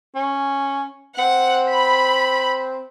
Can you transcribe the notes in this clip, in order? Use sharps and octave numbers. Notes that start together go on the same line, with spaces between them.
C#4
C4 F#5
B5